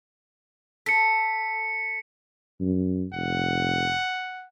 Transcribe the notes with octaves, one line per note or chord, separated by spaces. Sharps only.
A4 B6 C#7
F#2
F1 F#5